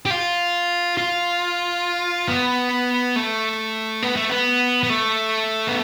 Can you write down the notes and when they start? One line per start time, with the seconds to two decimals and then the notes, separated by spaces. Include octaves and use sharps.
0.06 G4
0.10 F4
0.97 F4
2.28 B3
3.16 A3
4.03 B3
4.16 A3
4.29 B3
4.83 B3
4.90 A3
5.68 B3